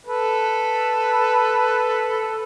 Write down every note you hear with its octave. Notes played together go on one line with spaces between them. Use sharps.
A4 B4